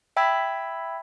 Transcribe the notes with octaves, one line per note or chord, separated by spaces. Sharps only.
E5 G5 B5 E6 G#6 B6